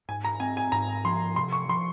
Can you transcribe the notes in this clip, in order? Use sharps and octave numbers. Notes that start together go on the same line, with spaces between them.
G#2 G#5
A#5
C4 G#5
G#5
G#2 A#5
F3 C6
C3 C6
C#6
F3 C6